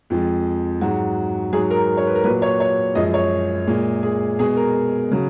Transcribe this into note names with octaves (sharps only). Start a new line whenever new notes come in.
F2 F3 G#3
G#2 F#3 F#4
G#2 F#3 G#4
A#4
C#5
B4
A#4
A#2 F#3 B4
C#5
C#5
F#2 F3 G#3 D#5
C#5
A#2 G#3
G#4
B2 G#3 G#4
A#4
C#3 F#3